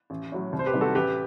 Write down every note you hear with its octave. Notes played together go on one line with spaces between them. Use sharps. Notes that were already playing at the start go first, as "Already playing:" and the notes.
A1
A2 F#3
C2
C5
G4 B4
C3 D#3 G3
F#4 A4
A1 G4 B4